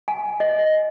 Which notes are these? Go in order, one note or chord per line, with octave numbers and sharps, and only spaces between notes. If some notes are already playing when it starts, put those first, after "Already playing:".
G#5
D#5